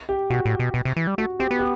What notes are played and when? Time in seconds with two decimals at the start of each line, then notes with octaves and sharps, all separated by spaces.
0.09 G4
0.30 B2 F#4
0.45 A2
0.59 B2
0.74 B2
0.85 C3
0.97 E3
1.07 G3
1.18 A3 F#4
1.39 C4 G4
1.51 B3
1.59 G4